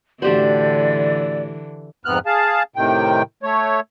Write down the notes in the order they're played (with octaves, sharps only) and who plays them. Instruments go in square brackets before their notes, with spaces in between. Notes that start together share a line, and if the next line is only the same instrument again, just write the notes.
[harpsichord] A1 F#4 [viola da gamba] D3 E3 [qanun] D4 G4 C5 [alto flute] D5
[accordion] F2 G#2 C3 B3 F6 F#6
G#4 F5 A5
A2 C3 D#3 G5
A3 C#5